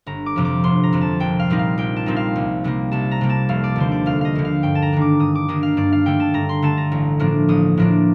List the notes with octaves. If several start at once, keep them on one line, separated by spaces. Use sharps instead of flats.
G1 A#5
D6
F2 C3 F3
D6
G1 C6
A#5
F2 C3 F3
A5
A#1 G5
F5
A#2 G3 C4 D#4
F5
A#1 G5
A5
A#2 G3 C4 D#4
F5
C2
C3 G3 A#3
C2 A5
A#5
C3 G3 A#3
A5
F1 F5
D5
D#2 D3 C5
D5
F1 F5
D#5 F5
D#2 D3
F5
G2 G5
A5
A#5
D#3 A#3 D4
D6
G2 D#6
D6
D#3 A#3 D4 D#6
F5
G2 D5
F5
D3 A3 G5
A5
G2 A#5
C6
D3 A3 A5
A#5
A1
A2 F3 A#3 D4
A1 D#6
A2 F3 A#3 D4